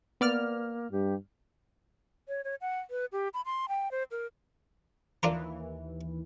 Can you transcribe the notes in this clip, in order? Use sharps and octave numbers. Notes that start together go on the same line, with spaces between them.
A#3 B3 D5 F6
G2 G4
C#5
C#5
F#5
B4
G4
B5
C6
G5
C5
A#4
D#2 E3 D4 F4 A#4